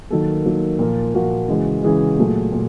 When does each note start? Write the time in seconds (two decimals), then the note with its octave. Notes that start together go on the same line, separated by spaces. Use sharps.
0.10 D#3 F#3 A#3 A4
0.45 D#3 F#3 A#3
0.79 A#2 F3 A#3 A#4
1.14 A#2 F3 A#3 F#4
1.48 C#3 E3 G#3
1.83 C#3 E3 G#3 G#4
2.18 A#2 F#3 A3
2.52 A#2